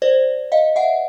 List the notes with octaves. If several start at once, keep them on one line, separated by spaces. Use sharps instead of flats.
C5 D5
D#5 F5
E5 F#5